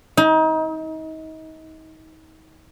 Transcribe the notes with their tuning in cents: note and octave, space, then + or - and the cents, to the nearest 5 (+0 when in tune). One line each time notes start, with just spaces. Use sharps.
D#4 +30